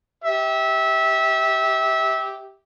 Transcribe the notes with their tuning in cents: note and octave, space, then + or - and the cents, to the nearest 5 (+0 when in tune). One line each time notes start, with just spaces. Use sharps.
G4 -5 E5 -20